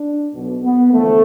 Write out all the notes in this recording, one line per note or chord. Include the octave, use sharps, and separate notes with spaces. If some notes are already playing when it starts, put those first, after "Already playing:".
Already playing: D4
B1 B2
B3
E2 D3 F3 A3